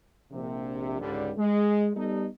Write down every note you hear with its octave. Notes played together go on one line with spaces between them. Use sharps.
A#1 C3
C#2 G#2 D3 G3
G#3
G3 B3 D#4 A4